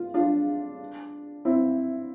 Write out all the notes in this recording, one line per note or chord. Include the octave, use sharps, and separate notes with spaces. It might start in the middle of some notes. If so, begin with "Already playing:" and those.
Already playing: F4
D4 F4
C4 E4